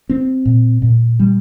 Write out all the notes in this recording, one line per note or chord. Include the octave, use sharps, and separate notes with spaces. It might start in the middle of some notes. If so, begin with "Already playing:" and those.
C4
A#2
A#2
G3